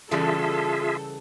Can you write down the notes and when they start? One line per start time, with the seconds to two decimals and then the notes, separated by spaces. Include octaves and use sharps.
0.11 C#3 E3 G3 F4 G#4 A4 E5